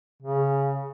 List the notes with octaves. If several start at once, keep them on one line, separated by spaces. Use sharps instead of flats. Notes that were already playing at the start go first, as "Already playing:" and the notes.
C#3